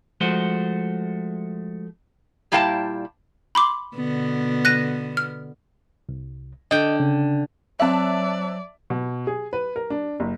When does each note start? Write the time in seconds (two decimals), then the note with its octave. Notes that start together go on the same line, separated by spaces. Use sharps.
0.21 F3 G#3 A3 F#4 C5
2.52 A#2 G3 E4 F5 G5 A5
3.55 B5 C6 D6
3.95 B2 D3 B3
4.65 F#6 A#6 D#7
5.17 F6
6.09 C2
6.71 D3 D#5 G5
7.00 C#3
7.80 F#3 C4 D5 E5 A5 F#6
8.90 B2
9.27 G#4
9.53 B4
9.76 A#4
9.90 D4
10.20 F#1